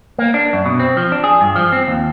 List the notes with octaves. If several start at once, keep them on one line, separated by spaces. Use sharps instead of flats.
A#3
D4
F#2
B2
C4
F3
D4
G#4
G2
F3
C4
D#2